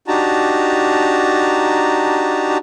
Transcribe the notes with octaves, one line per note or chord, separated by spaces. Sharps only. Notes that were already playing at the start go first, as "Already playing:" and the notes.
D4 D#4 F#4 G4 A5 A#5